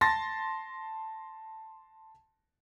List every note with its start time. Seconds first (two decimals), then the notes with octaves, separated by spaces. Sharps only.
0.01 A5 C6 A6 A#6